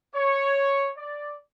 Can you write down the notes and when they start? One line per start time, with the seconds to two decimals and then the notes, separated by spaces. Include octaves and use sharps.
0.15 C#5
0.98 D5